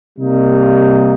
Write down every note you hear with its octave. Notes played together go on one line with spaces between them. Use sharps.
C3 G3 A#3 D#4